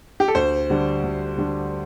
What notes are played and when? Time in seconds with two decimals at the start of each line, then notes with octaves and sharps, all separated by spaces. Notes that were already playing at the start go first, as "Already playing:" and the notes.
0.20 G4
0.28 A4
0.35 D2 C5
0.70 D3 G3 D4
1.03 D2
1.38 D3 G3 D4